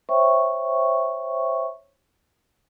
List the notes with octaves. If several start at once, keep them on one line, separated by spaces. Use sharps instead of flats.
C5 C#5 E5 G5 C#6